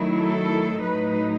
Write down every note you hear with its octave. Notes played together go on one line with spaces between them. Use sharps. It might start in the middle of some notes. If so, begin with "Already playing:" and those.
Already playing: D#3 F#3 A3 E4
A4
A2 F#3 A3 D#4 B4